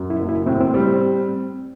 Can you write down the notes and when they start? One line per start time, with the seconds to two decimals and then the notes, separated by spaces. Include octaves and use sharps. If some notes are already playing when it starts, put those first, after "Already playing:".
Already playing: F#2
0.10 E4
0.19 F#1
0.29 E4
0.46 A2 C4
0.60 C4
0.74 G3 C4
0.88 C4